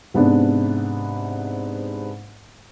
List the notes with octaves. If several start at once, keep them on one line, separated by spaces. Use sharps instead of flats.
G#2 C3 B3 D4